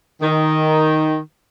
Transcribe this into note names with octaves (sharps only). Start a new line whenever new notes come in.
D#3